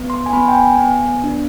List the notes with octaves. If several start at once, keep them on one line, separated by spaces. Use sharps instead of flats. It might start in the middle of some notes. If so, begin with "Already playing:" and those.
Already playing: B3
C6
G#5
B3 B5
G5
G#5
B3
D4